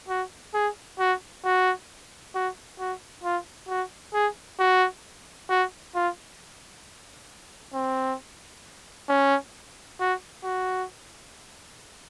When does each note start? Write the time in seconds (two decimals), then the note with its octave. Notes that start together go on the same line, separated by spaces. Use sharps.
0.09 F#4
0.54 G#4
0.99 F#4
1.45 F#4
2.35 F#4
2.79 F#4
3.24 F4
3.69 F#4
4.14 G#4
4.59 F#4
5.50 F#4
5.95 F4
7.74 C4
9.09 C#4
10.00 F#4
10.44 F#4